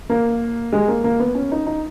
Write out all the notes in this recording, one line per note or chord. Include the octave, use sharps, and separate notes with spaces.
A#3
G#3
A#3
A#3
B3
C#4
D#4
D#4